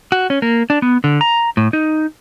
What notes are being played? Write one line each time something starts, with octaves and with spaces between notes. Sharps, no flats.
F#4
C#4
A#3
D4
B3
D3
A#5
A2
D#4